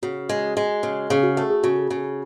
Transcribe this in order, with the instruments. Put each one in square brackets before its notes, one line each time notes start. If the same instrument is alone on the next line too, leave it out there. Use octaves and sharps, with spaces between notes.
[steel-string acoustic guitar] C#3 [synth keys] F#4
[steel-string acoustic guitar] G#3
G#3
C#3
[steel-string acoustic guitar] C#3 [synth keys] G#4
[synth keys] F#4
[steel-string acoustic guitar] A3 [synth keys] F#4
[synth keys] G#4
[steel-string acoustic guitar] C#3 [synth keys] F#4
[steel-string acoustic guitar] C#3